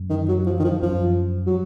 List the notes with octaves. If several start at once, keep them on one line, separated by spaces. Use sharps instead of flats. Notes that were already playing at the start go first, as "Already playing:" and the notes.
Already playing: F#2
D#3
F#3
F3
D#3
F3
F#2 F3
F#3